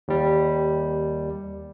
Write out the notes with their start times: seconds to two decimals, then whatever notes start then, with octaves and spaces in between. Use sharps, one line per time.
0.08 D#2 G3